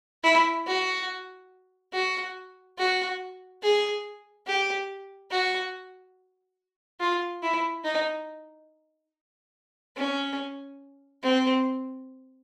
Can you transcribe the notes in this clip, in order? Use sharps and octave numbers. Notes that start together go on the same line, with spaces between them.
E4
F#4
F#4
F#4
G#4
G4
F#4
F4
E4
D#4
C#4
C4